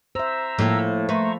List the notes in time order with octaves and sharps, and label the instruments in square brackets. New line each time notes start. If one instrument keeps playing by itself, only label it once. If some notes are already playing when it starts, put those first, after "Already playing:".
[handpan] C5 E5 [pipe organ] A#5 E6
[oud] A2 [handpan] F3 A#3 A4
[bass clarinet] A3 [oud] B4 [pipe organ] C5 A#5 C#6